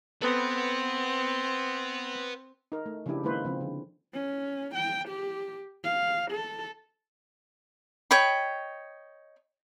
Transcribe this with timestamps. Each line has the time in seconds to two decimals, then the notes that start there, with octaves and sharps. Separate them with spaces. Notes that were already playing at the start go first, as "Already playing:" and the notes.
0.22 B3 C4 A4 B4 F#5
2.72 D#4 A#4
2.86 A3
3.06 C#3 F3 C#4 D4 E4 G4
3.23 D#3 G#3 A#3 E4 B4 C5
3.45 C#3 F3 C4
3.61 D3
4.13 C#4
4.74 G5
5.08 G4
5.84 F5
6.31 A4
8.11 C#5 D#5 G5 B5